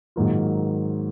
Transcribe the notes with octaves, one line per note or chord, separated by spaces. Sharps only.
G#2 D#3 F#3 A#3 F4